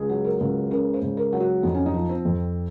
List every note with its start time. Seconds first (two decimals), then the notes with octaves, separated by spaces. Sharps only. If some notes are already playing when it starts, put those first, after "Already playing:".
Already playing: C#2 G#4
0.09 F#3
0.24 A#4
0.40 C#2
0.71 C#3 A#4
0.94 C5
1.02 C#2
1.17 A#4
1.33 F#3
1.40 F#4
1.63 F2 D#4
1.74 C#4
1.86 D#4
1.94 F3
2.09 C4
2.25 F2